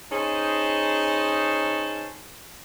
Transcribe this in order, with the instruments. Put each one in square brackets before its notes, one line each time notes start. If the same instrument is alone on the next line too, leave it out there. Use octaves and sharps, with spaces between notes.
[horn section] C#4 D#4 G#4 C5 A5